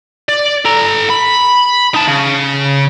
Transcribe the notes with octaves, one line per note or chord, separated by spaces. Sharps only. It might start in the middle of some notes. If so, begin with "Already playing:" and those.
D5
A4 A#5
B5
D#4 A5
C#3